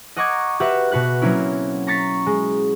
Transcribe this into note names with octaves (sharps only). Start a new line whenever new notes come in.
D#5 F#5 A#5 C#6 D6 G#6
F#4 G4 B4 E5 F#5
B2 F#4 B4 F#6
F#3 A#3 C4 C#4 E4
A#5 C#6 A6 B6
G#3